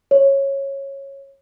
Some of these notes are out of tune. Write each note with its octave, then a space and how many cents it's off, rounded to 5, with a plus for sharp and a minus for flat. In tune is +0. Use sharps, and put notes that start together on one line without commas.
C#5 -15